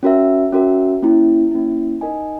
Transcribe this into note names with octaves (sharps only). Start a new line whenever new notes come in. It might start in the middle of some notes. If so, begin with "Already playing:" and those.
C#4 F#4 A#4 E5
C#4 F#4 A#4 E5
A#3 C#4 E4
A#3 C#4 E4
D#4 A#4 D#5 G#5